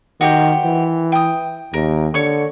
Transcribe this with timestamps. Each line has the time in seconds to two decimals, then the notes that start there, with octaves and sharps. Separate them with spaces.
0.21 D#3 F#4 G4 C5
0.65 E3
1.12 G5 D#6
1.74 D#2 A#4
2.14 D3 C#5 C#6